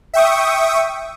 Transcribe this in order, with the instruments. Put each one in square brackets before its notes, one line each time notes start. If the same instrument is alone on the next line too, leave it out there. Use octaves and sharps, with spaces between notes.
[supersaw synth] E5 G5 C#6 D#6